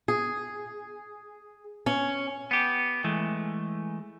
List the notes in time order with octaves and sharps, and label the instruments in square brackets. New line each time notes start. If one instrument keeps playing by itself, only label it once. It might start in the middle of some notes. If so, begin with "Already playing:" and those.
[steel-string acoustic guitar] G#4
C#4
[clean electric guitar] B3 G4
E3 G#3 A3